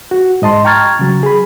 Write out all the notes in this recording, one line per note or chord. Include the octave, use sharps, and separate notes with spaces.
F#4
G#2 D#5 A5 C6
G5 A#5 C#6 F6 G#6 A6
C#3 F#3
G#4 B5